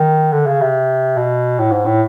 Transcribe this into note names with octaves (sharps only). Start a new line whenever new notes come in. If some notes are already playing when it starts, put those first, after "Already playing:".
Already playing: D#3
D3
C#3
C3
B2
A2
G#2
A2